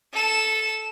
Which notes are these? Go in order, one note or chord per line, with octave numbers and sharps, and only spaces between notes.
A4 E7